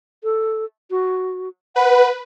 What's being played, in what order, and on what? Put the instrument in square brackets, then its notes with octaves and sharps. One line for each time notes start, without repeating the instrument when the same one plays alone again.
[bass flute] A4
F#4
[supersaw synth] B4 [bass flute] F#5